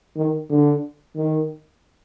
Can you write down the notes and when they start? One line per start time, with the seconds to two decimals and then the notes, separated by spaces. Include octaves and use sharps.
0.16 D#3
0.50 D3
1.17 D#3